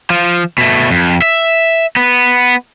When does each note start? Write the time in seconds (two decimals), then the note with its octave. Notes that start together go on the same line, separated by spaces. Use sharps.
0.10 F3
0.58 B2 A3
0.91 F2
1.22 E5
1.96 B3